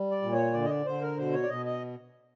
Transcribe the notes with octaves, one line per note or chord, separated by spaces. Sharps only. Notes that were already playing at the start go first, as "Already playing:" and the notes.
Already playing: G3
D5
A#2
C#5
D3 D5
D#5
D5
D3 C5
A#4
B2 C5
C#5
D5
B2 D#5
D#5